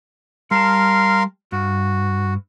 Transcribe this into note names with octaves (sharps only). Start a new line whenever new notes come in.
G3 A#4 F5 A5 C6
G2 F#4